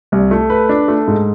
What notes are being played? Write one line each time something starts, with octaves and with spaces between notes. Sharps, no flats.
C2
A3
B4
D4
A3
G#2